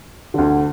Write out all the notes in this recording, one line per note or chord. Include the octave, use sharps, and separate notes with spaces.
D2 D3